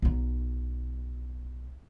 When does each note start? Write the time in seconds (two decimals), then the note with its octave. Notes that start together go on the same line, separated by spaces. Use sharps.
0.02 B1 D#4